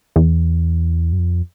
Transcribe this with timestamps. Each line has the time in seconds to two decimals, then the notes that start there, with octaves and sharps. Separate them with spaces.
0.16 E2
1.13 F#2
1.18 F2